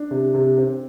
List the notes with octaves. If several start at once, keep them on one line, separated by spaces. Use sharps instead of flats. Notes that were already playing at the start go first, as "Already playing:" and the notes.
Already playing: D4
C3
C3
C4